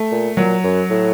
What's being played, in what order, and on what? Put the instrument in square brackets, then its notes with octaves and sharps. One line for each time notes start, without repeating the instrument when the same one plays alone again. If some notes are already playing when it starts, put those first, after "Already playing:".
Already playing: [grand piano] A3
[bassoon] A#2
[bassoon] A#2 [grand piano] F#3
[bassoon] F#2
A2